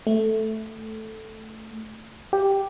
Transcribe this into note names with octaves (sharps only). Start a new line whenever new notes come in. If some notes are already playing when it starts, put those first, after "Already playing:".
A3
G4